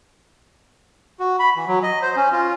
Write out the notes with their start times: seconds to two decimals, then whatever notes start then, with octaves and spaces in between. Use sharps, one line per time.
1.20 F#4
1.39 B5
1.56 E3
1.67 F#3
1.83 D#5
2.02 C5
2.16 C#4
2.33 F4